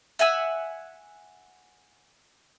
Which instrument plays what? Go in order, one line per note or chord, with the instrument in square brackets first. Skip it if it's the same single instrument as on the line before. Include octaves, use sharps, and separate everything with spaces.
[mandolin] E5 F#5 G#5 E6